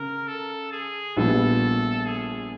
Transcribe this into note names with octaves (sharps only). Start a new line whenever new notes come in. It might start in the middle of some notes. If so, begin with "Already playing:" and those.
Already playing: C#3 A#4
A4
G#4
A#1 A#2 G3 B3 A4
G#4